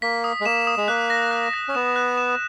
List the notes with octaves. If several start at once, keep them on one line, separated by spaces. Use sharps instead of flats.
A#3 B6
D#6
G#3
A#3 E7
D#6
G#3
A#3 F#6
A#6
F#6
A#6
C#4
B3 E7
F#6
E7